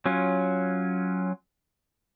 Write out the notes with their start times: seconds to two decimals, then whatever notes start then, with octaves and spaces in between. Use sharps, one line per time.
0.06 F#3 C#4 F4